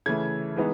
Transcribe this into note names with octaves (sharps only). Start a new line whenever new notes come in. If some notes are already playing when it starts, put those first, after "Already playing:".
C#3 E3 A3 G#6
E3 G#3 B3 D#4